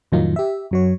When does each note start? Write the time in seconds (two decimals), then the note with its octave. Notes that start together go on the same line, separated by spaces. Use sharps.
0.12 F2 A2 D#3 F#3 D#4 F4
0.36 G4 E5
0.71 F#2 F#3 C#5